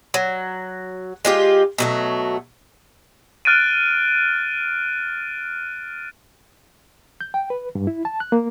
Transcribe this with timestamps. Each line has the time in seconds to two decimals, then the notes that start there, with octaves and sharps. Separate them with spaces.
0.14 F#3
1.25 G#3 F4 G4
1.78 B2 F#3 A3
3.45 F6 F#6 A6 D7 D#7
7.21 G6
7.34 G5
7.50 B4
7.75 G2
7.87 E4
8.05 A5
8.20 F#6
8.32 A#3